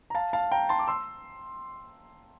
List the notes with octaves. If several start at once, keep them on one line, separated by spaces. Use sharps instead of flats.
A#5
F5 A5
F5 A5
G5 A#5
A5 C6
D6
C6 E6